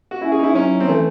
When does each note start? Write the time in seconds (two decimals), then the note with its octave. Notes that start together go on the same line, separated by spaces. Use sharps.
0.11 F#4
0.21 C#4 E4
0.32 G#4
0.39 D#4
0.43 E4
0.55 F#3 C#4
0.80 C4
0.89 E3 A3